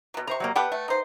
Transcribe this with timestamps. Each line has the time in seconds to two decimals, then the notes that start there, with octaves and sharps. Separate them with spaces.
0.14 B2 F#3
0.27 C3 C5 A#5 C#6
0.40 F#3 G3 A#3
0.56 B3 G4 A4 B4 F#5 G5
0.72 A3
0.88 D#4 C5